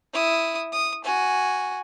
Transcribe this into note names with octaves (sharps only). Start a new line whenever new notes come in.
E4 D#6
D#6
F#4 G#5